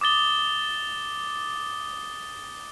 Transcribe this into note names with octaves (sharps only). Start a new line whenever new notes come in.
D6 D#6 A6 G7